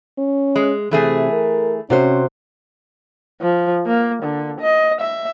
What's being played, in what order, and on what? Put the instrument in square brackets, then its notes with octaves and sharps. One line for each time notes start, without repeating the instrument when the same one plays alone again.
[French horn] C#4
[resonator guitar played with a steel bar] G#3
[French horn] C3 [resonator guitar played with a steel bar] E3 A3 G#4
[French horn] A#4
[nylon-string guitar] C3 F#4 C5 [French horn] C#4
[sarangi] F3
A#3
D3
D#5
E5